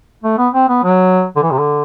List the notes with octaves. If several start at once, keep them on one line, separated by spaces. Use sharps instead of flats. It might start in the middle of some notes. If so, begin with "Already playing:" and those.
A3
B3
C4
B3
F#3
D3
E3
C3
D3